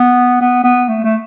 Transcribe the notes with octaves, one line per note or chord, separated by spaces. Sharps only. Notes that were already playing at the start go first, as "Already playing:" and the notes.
Already playing: B3
B3
B3
A3
A3